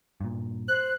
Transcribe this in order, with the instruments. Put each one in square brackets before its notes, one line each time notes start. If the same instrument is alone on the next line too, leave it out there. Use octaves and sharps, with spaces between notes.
[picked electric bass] G2 A#2
[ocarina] C5 [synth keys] F#6